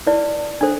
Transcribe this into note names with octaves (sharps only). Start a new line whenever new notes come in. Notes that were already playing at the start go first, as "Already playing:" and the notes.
E4 B4 D5
D4 A4 C5